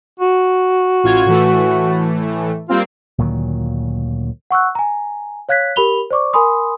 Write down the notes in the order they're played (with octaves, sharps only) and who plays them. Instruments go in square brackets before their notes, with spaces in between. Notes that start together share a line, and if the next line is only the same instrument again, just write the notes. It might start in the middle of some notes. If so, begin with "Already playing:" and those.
[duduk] F#4
[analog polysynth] A1 F4 G#6
A2 E3 A3
[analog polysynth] G3 A#3 C4 [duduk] F4
[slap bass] D2 A#2 D#3 F#3
[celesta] F#5 C#6 E6 F#6
G#5 A#5
C#5 F5 F#6 G#6 B6
G4 A#4 B5 F7 G7
C5 D5 C#6 D6
A#4 G#5 B5 C6 D#6